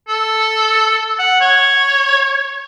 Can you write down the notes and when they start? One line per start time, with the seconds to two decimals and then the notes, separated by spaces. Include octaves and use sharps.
0.08 A4
1.19 F#5
1.41 C#5